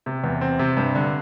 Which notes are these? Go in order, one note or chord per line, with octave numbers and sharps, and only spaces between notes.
C3
E2
C4
C3
G2
D3